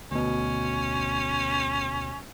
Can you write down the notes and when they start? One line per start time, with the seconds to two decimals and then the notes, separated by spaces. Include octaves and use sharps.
0.11 D2 B2 C#4